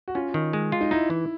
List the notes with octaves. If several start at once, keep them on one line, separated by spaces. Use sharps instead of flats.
F#4
C#4 F4
D#3
G#3
F4
D#4
D#4 E4
E3